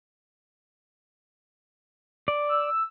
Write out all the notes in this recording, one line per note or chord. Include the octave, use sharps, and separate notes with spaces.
D5
E6